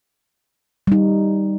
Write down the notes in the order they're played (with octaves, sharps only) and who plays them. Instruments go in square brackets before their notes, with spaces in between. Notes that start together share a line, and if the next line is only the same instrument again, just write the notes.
[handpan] G3 D#4